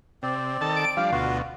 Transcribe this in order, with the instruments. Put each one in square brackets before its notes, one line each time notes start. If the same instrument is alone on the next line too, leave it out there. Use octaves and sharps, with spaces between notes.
[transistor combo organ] C3 [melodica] C4 D5
[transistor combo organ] D#3 A4 A5
[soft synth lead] D7
[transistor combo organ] F3 G3 D4 [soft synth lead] F5
[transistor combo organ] D2 B2 [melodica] F4 F#4